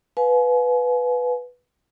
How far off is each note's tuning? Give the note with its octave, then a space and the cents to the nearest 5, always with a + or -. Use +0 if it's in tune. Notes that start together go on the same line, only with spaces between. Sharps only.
B4 +0 F5 +30 G#5 +35